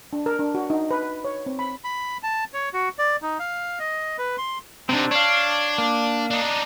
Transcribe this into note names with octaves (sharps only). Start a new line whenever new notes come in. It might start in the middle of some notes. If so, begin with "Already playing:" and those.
D4
A#4
D4
F#4
D#4
B4
C#5
C4
B5
B5
A5
C#5
F#4
D5
D#4
F5
D#5
B4
C6
C3 C4 D4 D#4
D4 C#5 F5
A#3
D4 D#4